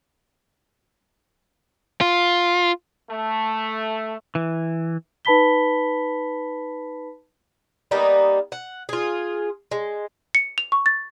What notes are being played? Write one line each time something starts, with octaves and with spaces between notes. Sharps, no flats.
F4
A3
E3
D#4 B4 A5 B5 B6 G7
G3 A#3 B3 D#4
F#5
F4 G#4
G#3
C#7
F7
C#6
A6